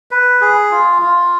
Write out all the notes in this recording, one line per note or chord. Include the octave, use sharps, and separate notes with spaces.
B4
G#4
F4
F4